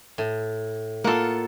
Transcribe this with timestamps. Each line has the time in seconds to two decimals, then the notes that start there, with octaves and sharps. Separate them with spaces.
0.18 A2
1.04 A#3 F4 A4 F#5